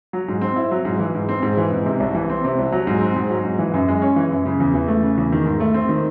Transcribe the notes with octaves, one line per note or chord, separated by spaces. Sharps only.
F#3
G#2
C4
E4
F#3
G#2
E3
G#2
C4
G#2
E3
G#2
C3
C2
E3
C4
C3
C2
F#3
G#2
C4
G#2
F#3
G#2
E3
F#2
G#3
C#4
E3
F#2
C#3
E2
E3
A3
C#3
E2
D#3
G#2
A3
C4
D#3